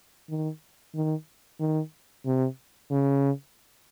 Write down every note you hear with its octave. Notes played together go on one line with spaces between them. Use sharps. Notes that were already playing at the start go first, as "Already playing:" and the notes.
D#3
D#3
D#3
C3
C#3